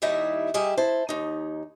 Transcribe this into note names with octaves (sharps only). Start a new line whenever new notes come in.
D#2 G3 D#4 E4 D#5 E5
G3 G4 G#4 D#5 E5
E4 C5 A5
D#2 D#4